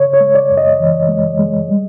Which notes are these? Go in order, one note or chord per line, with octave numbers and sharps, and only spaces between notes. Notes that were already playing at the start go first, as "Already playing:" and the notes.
Already playing: C#3 C#5
C#5
G#3
D5
F#2
D#5
E3
G#3
G#3
G3